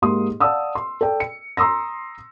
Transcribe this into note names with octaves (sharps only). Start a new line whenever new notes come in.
G#2 A#3 G4 C6 D#6
D5 F5 F#5 A5 D#6 E6
C6
A4 D5 G5
C#7
A#5 C6 D#6 E6 A#6